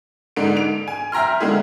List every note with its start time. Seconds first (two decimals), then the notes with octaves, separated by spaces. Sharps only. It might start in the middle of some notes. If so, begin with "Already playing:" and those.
0.36 G#2 D3 D7
0.57 D7 F7
0.88 G#5
1.12 E5 G5 A#5 C6 F6
1.40 D3 G#3 E4 G#4